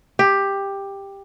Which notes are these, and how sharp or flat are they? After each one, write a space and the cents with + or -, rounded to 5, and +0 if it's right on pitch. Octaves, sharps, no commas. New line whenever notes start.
G4 +10